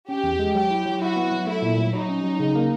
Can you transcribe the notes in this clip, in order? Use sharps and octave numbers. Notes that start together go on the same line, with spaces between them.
C#4 G4
E2
G#3
F#3 G4
E4
F#3
E4 F#4
B3
F#3
A3 E4
A#2
F#3
F#3 D#4
C#4
F#3
C#3
A#3